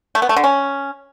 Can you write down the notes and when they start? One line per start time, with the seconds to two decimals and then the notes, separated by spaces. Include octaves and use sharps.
0.15 A3
0.22 B3
0.29 A3
0.36 D3
0.44 C#4